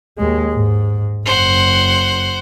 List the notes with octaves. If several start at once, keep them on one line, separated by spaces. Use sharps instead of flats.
D#2 G#3
G#2
F#1 C5 F#5